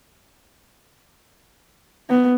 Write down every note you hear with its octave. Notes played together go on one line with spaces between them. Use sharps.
B3